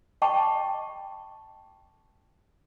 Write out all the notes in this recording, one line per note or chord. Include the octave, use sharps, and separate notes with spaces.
D#5 G5 A5 B5 C#6 D6